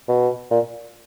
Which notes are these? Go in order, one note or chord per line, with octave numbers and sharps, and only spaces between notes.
B2
A#2